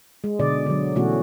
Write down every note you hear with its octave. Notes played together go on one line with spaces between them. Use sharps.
G#3
B2 D3 D5 D#5
D3 F#3
B2 E3 A3 C#4 F#4